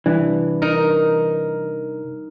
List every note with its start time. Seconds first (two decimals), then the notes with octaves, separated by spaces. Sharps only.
0.06 C3 E3 G3 D4
0.62 D#4 A#4